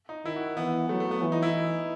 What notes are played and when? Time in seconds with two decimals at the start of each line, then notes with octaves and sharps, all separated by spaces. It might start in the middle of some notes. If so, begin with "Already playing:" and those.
0.09 D#4
0.25 D#3 E4
0.36 F#4
0.57 E3 B3
0.89 F#3 A3
1.00 A3
1.11 B3
1.22 E3
1.32 D#4
1.42 E4